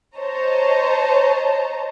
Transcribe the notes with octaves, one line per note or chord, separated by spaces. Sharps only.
C5 C#5 D#5 A5 A#5